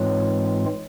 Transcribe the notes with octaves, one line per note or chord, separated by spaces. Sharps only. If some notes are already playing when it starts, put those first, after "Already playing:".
Already playing: G#2 E3 G#3 C4 F4 C#5